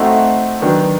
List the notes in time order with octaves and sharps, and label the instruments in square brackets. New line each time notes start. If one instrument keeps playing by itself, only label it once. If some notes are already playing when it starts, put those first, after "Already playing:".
Already playing: [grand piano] A3 C4 D#4 F#4
D#3 F#3 B3 D4